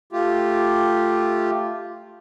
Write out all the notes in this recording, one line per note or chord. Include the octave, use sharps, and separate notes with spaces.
A3 F4 G4